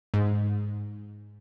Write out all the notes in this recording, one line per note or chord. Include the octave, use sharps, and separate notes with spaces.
G#2